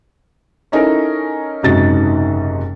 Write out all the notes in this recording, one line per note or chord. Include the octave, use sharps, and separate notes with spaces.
C#4 D#4 E4 A4 A#4
F#1 G#2 C3 D#4 F#4 A6